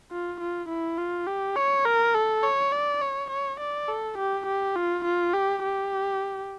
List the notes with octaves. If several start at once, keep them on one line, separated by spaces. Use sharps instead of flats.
F4
F4
E4
F4
G4
C#5
A#4
A4
C#5
D5
C#5
C#5
D5
A4
G4
G4
F4
F4
G4
G4